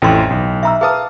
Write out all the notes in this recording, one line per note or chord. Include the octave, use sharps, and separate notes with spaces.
A1 F2 A2 G5 C6
B1
E5 A#5 E6
G#4 B4 F5 A5 D#6